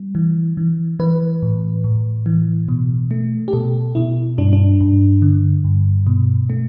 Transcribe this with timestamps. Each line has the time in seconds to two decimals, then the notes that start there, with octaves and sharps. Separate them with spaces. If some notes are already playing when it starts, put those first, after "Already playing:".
Already playing: G3
0.15 E3
0.57 E3
0.99 E3 B4
1.42 A2
1.84 A2
2.26 E3
2.68 B2
3.11 A3
3.48 G4
3.53 B2 A4
3.95 B2 E4
4.38 G2 D4
4.53 D4
4.81 G2
5.22 D3
5.64 G2
6.07 B2
6.50 A3